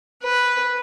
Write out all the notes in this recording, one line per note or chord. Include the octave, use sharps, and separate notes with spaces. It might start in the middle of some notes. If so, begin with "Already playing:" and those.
B4